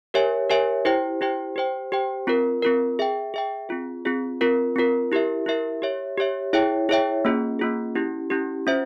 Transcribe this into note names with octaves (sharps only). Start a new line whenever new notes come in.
G4 A#4 C#5 E5 G#5
G4 A#4 C#5 E5 G#5
E4 G4 C5 G5
E4 G4 C5 G5
G4 C5 G5
G4 C5 G5
C4 F4 A#4
C4 F4 A#4
G#4 E5 G5
G#4 E5 G5
C4 F4 G#4
C4 F4 G#4
C4 F4 A#4
C4 F4 A#4
E4 G4 A#4 E5
E4 G4 A#4 E5
G4 C#5 E5
G4 C#5 E5
E4 G#4 C#5 E5 G5
E4 G#4 C#5 E5 G5
A#3 C#4 F4 G#4
A#3 C#4 F4 G#4
C#4 E4 G4
C#4 E4 G4
C#4 F4 C5 E5